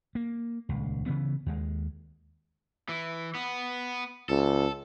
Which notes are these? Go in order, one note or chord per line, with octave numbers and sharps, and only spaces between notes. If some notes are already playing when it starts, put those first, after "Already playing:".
A#3
D#1 C#2
C#3 E3 B3
D#2 G#3
E3
B3
C#2 A4